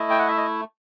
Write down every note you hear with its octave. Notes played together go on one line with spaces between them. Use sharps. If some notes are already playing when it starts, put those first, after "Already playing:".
Already playing: A3 E4 D#5
G5
F#5
E5
D#5